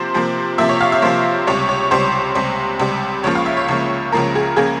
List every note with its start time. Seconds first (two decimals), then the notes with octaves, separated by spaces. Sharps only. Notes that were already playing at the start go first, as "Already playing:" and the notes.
Already playing: C3 F3 A#3 C5
0.14 C3 F3 A#3
0.58 C3 F3 A#3 E5
0.69 C#5
0.81 F5
0.92 E5
1.02 C3 F3 A#3 C5
1.47 C#2 C3 G3 C#5
1.69 C#5
1.91 C#2 C3 G3 C5
2.35 C#2 C3 G3
2.80 C#2 C3 G3
3.23 C#2 C#3 F3 A#3 C#5
3.35 F5
3.46 E5
3.57 C#5
3.68 C#2 C#3 F3 A#3
4.12 C#2 C#3 F3 A#3 A#4
4.35 G#4
4.56 C#3 F3 A#3 G#4